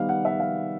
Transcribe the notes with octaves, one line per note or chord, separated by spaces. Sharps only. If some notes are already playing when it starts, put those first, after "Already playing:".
Already playing: D#3 G3 B3 D#4 F5
F#5
E5
F5